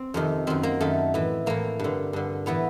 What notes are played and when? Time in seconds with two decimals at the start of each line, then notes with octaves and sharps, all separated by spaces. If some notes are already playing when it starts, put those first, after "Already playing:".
Already playing: C4
0.14 F2 C3 D#3
0.47 F#2 D#3 C4
0.63 A#3
0.80 F#2 D#3 A3
1.14 A2 E3
1.46 A2 E3 A#3
1.79 G2 D3
2.13 G2 D3
2.46 A2 E3 B3